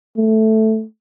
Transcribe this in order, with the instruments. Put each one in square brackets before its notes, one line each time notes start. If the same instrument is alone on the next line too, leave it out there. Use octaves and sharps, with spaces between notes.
[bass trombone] A3